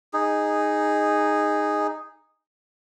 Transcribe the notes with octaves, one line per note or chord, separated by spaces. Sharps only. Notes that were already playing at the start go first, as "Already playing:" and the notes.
D#4 G#4